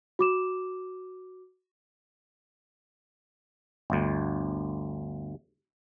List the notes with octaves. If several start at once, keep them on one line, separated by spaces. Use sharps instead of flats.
F#4 D6 E7
G1 D2